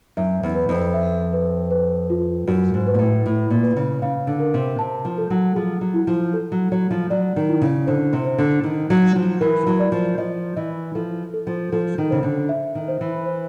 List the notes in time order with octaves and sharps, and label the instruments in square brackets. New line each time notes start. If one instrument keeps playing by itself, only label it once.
[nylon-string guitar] F#2 [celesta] E5
[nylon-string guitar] E2
[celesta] B4
[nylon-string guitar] F2
[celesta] E5
B4
B4
F4
[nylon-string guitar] F#2 [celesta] F#4
[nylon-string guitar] G#2
[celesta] B4
[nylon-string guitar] A#2
A2
[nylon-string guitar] A2 [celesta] E4
[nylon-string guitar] A#2
[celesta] B4
[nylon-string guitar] C#3
[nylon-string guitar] C#3 [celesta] F5
[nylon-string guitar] D3
[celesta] A#4
[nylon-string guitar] C3
[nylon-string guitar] C3 [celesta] A5
[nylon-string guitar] F3
[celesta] A4
[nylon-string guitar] F#3
[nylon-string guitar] F3 [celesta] G#4
[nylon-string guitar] F#3
[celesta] E4
[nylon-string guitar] F3
[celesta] A4
[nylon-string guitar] F#3
[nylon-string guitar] F#3 [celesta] C#5
[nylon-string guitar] F3
[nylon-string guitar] F#3 [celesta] D5
[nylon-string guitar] D#3
[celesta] E4
[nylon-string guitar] C#3
[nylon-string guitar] D3 [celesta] C5
[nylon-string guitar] C3
[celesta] C5
[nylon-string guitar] D3
[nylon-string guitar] D#3 [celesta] D#4
[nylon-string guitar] F#3
[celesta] D#4
[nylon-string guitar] F3
[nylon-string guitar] E3 [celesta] A#4
[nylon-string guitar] F#3
[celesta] D5
[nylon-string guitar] F3
[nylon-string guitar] F3 [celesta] D#5
[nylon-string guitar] E3 [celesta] D#5
[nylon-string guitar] F3 [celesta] A4
[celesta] A4
[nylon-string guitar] F3
[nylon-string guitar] F3 [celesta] A4
[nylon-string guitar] D#3
[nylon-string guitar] C#3 [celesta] C5
[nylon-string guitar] D3
[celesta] E5
[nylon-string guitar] D#3
[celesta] C5
[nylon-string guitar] E3
[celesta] C5